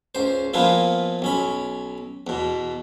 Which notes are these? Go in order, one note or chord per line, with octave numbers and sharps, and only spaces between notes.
C#2 C5
A#2 F3 B3 E4 F4
B1 C#4 B5
E2 B2